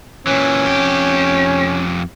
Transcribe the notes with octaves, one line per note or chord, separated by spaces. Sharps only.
A#2 E3 C#4
F2 G4